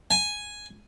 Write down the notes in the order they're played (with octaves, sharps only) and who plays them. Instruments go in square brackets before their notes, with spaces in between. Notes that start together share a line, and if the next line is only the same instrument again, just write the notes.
[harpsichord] G#5